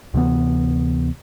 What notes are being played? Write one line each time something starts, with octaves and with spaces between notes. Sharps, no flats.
D2 C3 E3 B3